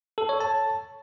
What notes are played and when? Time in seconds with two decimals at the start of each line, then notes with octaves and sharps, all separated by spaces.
0.18 A4
0.29 C#5
0.40 A5